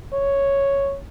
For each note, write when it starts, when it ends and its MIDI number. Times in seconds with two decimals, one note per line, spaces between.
0.13 0.97 73